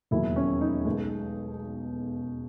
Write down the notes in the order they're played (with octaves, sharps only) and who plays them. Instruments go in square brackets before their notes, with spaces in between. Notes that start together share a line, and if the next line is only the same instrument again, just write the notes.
[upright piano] E1 D#2 D#3 F#3 E4
C#4
D#4
B1 B2 G#3